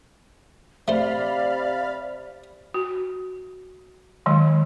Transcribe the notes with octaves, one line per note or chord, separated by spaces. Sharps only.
C3 A3 C5 D5 F5 B5 F6
F#4
D#3 F#3 G#3